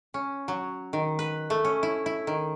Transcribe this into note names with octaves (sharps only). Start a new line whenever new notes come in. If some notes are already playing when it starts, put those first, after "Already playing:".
C#4
F#3
D#3
B4
A3
C#4
E4
E4
D#3